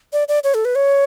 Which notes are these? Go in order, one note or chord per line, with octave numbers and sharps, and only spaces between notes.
D5
D5
C#5
A4
B4
C#5